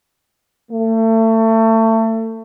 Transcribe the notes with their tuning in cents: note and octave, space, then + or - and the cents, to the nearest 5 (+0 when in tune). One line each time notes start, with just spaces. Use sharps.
A3 +30